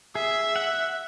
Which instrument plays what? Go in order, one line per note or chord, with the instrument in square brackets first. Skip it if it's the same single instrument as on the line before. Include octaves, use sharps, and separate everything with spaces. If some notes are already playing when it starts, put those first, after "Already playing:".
[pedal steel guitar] G#4 [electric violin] E5
[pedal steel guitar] F#5